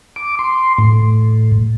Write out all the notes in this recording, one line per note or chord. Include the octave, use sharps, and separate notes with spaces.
D6
C6
A2